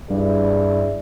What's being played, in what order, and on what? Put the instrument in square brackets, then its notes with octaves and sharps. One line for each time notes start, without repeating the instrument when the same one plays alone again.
[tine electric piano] G2 [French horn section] E4 G#4 D5